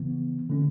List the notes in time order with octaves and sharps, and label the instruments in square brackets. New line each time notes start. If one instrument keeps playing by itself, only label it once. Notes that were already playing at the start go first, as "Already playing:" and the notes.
Already playing: [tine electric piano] C#3 E3 B3
D3 A3 C#4